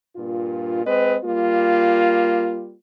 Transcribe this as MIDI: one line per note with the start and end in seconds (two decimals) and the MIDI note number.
0.16 0.83 43
0.16 0.83 46
0.16 0.83 65
0.86 1.17 56
0.86 1.17 60
0.86 1.17 71
0.86 1.17 75
1.24 2.74 55
1.24 2.74 58
1.24 2.74 65